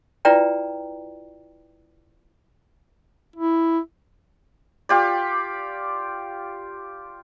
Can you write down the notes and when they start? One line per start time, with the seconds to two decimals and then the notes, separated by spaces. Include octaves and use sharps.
0.25 E4 F4 B4 D5 G5 A#5
3.36 E4
4.89 F4 G4 D5